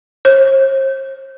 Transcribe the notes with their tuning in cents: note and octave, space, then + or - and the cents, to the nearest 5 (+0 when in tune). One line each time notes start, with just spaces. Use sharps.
C5 +45